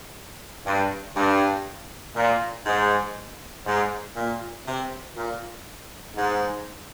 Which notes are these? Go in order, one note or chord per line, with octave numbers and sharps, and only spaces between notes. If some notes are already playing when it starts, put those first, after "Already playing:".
G2
G2
A#2
G#2
G#2
A#2
C3
A#2
G#2